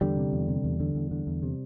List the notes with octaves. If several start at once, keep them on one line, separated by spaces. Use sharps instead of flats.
E2 D3 G3
C3
E2
C3
E2
D3
E2
D3
E2
C3